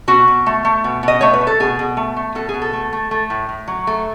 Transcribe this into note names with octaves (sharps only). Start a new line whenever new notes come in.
B2 F#4
B2
A3
A3
B2
B2 D#5
A3 C#5
B4
A3
A4
B2 G#4
B2
A3
A3
B2 A4
G#4
B2
A4
A3
A3
A3
A2
A2
F#3
A3